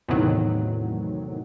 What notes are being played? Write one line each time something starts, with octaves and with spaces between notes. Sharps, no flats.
E2 A2 C3 D#3 F#3